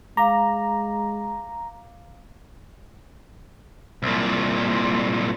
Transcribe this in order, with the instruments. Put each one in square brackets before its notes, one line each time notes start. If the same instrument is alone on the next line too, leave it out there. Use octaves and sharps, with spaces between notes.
[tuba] G#3 [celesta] F5 D6 [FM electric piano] A#5
[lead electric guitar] C2 A#2